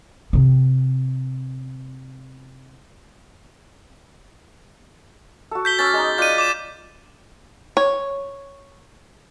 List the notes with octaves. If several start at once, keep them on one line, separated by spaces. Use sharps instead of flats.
C3 C4
F#4 A4
G6 B6 G7
C#4 D6 E6 A6
G#3 D#4
F4 D5 F#5 G6 D#7
D6 E7
C#5